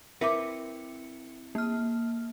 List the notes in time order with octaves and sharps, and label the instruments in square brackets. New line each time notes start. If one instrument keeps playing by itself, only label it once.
[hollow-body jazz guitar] C4 E4 B4 [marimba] A#4 E5 D6 [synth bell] C#7
[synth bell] A#3 F6